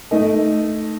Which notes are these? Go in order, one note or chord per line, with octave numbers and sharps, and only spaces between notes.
A3 D#4 A4 D#5